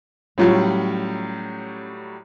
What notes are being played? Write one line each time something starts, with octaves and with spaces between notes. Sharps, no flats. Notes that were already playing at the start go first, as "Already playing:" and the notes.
A2 F#3 G3 C#4 F4